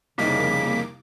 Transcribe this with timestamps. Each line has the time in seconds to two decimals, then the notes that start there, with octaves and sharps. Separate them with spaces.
0.18 C2 F2 C#3 A#3 D#4 D6 B6